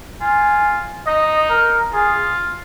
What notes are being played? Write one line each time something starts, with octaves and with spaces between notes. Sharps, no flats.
F4 G#5
D#4 D#5
A#4
F4 G#4